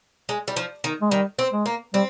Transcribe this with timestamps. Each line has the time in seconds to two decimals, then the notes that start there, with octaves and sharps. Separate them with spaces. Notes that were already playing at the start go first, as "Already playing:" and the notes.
0.29 G#3
0.48 G3
0.56 F3
0.84 D#3
1.02 G#3
1.11 D#3 G3
1.39 C4
1.52 G#3
1.66 A#3
1.94 G3 C4